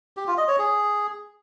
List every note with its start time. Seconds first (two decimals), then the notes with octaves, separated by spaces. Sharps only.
0.17 G4
0.27 F4
0.38 D#5
0.48 C#5
0.59 G#4